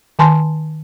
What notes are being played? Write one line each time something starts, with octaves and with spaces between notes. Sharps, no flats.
D#3 G#5 A5 C6